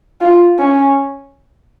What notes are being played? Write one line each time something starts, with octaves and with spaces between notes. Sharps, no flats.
F4
C#4